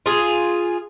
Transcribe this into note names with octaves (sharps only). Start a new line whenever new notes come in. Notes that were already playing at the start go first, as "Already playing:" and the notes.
F4 G#4